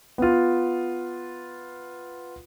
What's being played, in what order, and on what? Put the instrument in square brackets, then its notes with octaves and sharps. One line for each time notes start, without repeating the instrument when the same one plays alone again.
[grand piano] B3 F4